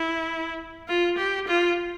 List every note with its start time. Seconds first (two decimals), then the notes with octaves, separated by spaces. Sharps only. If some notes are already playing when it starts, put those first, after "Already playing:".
Already playing: E4
0.88 F4
1.18 G4
1.48 F4